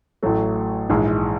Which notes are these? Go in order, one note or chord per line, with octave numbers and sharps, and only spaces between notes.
A1 A2 F#3 A3
A#1 G#2 E3 G#3